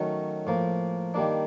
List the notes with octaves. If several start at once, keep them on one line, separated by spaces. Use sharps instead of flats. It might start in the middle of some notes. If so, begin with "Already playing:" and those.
Already playing: D#3 F#3 A3 C#4 F#4
A2 F3 A#3
D#3 G3 A#3 D4